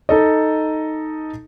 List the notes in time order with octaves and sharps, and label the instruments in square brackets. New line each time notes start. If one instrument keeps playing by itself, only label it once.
[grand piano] D#4 A4 D#5